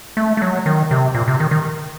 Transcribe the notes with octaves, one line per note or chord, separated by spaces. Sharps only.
A3
A3
F#3
D#3
C3
A#2
C3
D#3
D#3